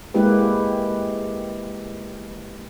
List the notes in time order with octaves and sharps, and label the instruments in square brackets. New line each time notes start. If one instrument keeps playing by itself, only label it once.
[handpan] G#3 A#3 E4 G4 B4